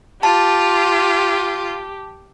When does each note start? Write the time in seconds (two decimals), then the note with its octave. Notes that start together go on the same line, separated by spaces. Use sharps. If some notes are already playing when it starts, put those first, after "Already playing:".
0.23 F4 G4 A5